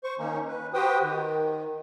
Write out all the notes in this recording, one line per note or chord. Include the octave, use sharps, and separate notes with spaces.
C5 C#6
D#3 A#3 C#4 D#4
B4
F#4 G4 B4 C5 G5 D#6
D#3